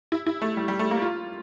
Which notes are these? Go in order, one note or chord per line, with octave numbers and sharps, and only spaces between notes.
E4
E4
A3
G3
G3
A3
A#3
F4